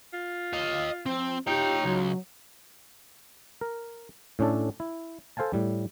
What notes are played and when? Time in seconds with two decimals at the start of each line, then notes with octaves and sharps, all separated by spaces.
0.13 F4
0.53 D#5 F5
1.06 F3 C4
1.47 D#4 F4 G4 C#5 G5
1.84 C#2 F#3
3.61 A#4
4.39 A2 C#4 D4 A4
4.80 E4
5.37 A4 C5 F5 G#5 A5
5.53 A2 G3